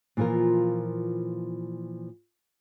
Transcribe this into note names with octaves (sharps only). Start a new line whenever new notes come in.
A#2 E3 F3 F4 A#4